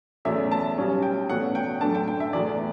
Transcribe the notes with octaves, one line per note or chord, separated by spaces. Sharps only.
E2 B2 F#3 A3 C#4 E5
A5
B1 B2 G3 C#4
G5
E2 B2 A3 C#4 F#5
G5
F#2 D3 A3 D4 A5
G5
G5
E5
E2 B2 A3 D5